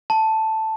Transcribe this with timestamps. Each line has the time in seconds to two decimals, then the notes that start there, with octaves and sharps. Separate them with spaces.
0.10 A5